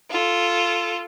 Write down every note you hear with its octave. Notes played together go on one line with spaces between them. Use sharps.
F4 A4